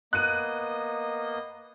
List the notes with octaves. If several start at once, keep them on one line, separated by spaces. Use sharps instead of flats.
A#3 B3 D#5 F#6 D#7